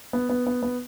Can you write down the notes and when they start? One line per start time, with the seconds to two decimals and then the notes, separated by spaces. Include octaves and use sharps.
0.13 B3
0.29 B3
0.47 B3
0.63 B3